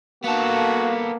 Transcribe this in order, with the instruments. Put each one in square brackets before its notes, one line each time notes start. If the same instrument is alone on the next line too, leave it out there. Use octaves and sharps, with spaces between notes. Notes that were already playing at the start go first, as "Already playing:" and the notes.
[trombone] A#3 [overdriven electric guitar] B3 A4 [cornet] F#4 [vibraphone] F5